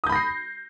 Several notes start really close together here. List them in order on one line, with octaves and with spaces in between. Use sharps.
D#6 G6 B5 A#6 C7